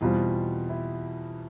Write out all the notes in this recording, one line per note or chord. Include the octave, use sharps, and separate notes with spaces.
E2 B2 G3 C4 F4
E4